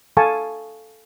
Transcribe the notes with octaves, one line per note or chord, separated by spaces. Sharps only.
A4 F5 G#5 A5 C#6